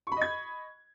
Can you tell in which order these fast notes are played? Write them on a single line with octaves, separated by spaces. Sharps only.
C#6 B5 D#5 G#6